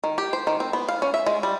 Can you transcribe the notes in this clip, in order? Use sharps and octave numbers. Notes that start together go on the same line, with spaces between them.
D#3
G4
C5
D#3
C4
B3
F5
C#4
E5
G#3
G3